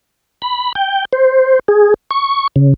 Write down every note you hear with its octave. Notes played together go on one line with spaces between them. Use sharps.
B5
G5
C5
G#4
C#6
C#3